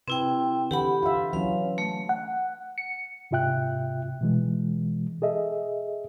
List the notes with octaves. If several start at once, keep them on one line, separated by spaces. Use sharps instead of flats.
C3 C4 E4 B4 G5
D3 E3 G4 F#5 B5
F4 E5
E3 F#3 C#4 F5
A3
F#5
C#7
G#2 C3 F4 E5 G5 F#6
B2 E3 G#3
G#4 A4 D#5 E5